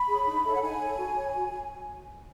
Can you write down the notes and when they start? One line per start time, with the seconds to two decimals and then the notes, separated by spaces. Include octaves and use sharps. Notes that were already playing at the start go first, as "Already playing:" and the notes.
Already playing: B5
0.08 G#4 C#5
0.26 D#4
0.44 A4 C#5 E5
0.54 F#5
0.62 D#4 G#5
0.80 A4 C#5
0.98 F#4
1.17 C#5
1.35 F#4